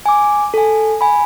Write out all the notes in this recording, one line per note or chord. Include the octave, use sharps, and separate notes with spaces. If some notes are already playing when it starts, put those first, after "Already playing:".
G#5 D6
A4 G#5
G#5 B5